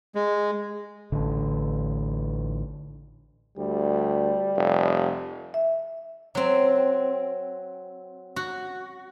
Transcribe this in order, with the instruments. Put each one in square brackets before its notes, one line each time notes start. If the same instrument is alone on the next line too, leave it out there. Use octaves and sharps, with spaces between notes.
[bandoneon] G#3
[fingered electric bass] A1 D3
[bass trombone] D2 [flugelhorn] G3
[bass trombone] F1
[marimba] E5
[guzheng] F#3 C4
F#4